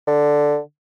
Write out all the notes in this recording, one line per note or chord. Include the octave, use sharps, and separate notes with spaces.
D3